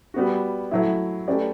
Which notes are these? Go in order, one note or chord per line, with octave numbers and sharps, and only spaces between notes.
G3 B3 F#4
F#3 A3 E4
A3 C#4 G4 B4 D5